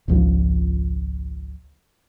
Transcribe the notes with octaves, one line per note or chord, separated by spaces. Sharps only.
G#1 C#2 F3